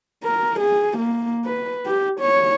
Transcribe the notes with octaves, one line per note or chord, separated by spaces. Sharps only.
A#4
G#4
A#3
B4
G4
C#5